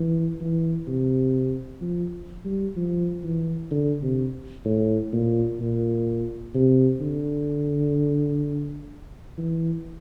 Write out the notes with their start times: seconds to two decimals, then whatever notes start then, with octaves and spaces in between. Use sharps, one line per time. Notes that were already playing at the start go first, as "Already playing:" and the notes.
Already playing: E3
0.40 E3
0.87 C3
1.82 F3
2.45 G3
2.76 F3
3.24 E3
3.71 D3
4.03 C3
4.65 A2
5.13 A#2
5.60 A#2
6.54 C3
7.01 D3
9.38 E3